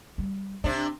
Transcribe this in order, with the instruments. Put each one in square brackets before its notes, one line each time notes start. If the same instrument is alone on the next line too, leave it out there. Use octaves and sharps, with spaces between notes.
[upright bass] G3
[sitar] C3 D4 [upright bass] C4